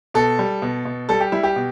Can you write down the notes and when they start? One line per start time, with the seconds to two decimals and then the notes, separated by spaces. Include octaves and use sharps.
0.14 B2 A4
0.39 G3
0.62 B2
0.85 B2
1.09 G3 A4
1.20 G4
1.32 G3 E4
1.43 G4
1.56 B2